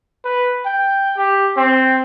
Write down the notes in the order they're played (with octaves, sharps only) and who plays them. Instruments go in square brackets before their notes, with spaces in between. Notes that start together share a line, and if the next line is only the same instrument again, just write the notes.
[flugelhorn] B4
G5
G4
C4